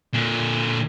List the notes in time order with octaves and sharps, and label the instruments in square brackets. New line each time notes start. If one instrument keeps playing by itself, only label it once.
[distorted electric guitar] A#2 D3